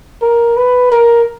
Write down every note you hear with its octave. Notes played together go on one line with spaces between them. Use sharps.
A#4
B4
A#4